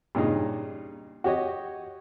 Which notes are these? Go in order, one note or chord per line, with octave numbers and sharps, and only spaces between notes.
G2 A#2 C#3 D#4
F#4 G4 C#5 D#5